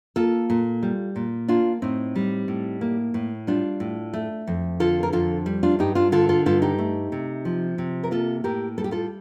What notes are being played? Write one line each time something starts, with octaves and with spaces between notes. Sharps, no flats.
A#3 F4 A4
A#2
G3
A#2
A#3 D4 F4
A2 C4 D#4
G3
A2
A#3
A2
G3 D4 F4
A2
A3
F2
D3 F4 A4
A#4
F2 F4 A4
G3
D4 F4
G2 D#4 G4
D4 F4
D3 F4 A4
F4 A4
G2 F4 A4
D#4 G4
A3
C3
F3
C3
A#4
A#3 F4 A4
A2 G4 A#4
G3 A4
G4
F4 A4